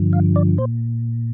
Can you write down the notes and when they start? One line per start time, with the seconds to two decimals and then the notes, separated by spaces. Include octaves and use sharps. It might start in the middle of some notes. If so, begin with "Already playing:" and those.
Already playing: G2 D3 F3
0.13 F5
0.36 D5
0.58 A#2 C5